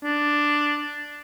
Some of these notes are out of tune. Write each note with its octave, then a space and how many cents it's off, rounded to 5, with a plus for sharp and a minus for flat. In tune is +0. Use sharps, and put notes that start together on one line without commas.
D4 +0